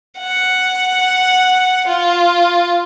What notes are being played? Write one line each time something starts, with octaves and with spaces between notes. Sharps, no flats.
F#5
F4